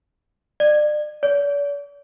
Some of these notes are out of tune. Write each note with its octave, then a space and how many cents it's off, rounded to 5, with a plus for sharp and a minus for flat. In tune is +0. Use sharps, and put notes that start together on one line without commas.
D5 +35
D5 -45